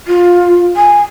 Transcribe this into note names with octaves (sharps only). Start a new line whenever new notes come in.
F4
G#5